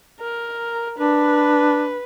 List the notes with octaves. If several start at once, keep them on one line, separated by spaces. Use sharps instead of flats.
A#4
D4 B4